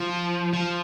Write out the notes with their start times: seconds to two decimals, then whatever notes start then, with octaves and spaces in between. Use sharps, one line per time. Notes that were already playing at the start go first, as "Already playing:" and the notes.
Already playing: F3
0.53 F3